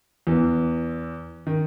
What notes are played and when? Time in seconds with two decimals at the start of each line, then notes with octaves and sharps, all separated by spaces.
0.27 E2 E3
1.47 D#3